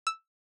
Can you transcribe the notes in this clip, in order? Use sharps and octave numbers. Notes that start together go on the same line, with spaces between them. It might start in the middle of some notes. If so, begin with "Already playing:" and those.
E6